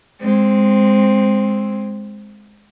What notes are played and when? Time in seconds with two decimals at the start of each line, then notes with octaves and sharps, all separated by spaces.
0.21 G#3 C4